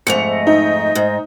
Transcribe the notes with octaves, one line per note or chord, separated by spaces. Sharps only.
F2 G#2 A3 C#7 F7
D#5
D#4
G#2